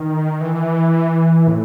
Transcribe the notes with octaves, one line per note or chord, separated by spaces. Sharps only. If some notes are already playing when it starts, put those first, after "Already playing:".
Already playing: D#3
E3
A2